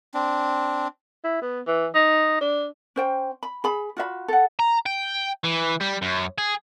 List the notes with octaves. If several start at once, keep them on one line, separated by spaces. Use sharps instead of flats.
C4 D4
E4
B3
E3
D#4
D4
C#4 C5 G5
B5
G#4 B5
F4 F#4 E5 B5
A4 F#5
A#5
G5
E3
G3
F#2
G#4